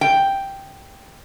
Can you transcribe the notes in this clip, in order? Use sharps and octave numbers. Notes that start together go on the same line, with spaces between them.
G5